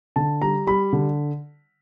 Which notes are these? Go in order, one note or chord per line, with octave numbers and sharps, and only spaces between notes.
D3 A5
G3 A#5
G3 B5
D3